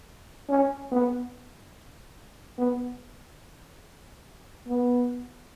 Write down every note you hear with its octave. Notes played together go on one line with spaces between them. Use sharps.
C#4
B3
B3
B3